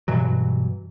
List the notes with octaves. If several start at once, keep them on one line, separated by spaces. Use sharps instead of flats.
G2 B2 E3 F#3